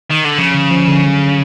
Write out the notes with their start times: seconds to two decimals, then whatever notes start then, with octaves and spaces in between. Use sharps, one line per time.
0.11 D#3
0.25 D3
0.38 C#3 F3
0.54 D3
0.71 F3
0.88 D3
1.04 F#3